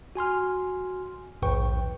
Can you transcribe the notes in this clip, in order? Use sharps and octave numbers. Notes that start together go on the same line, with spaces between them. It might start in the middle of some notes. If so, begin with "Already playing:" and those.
F#4 G#5 C6 F6
A#1 D#2 G#2 B4 G5 C#6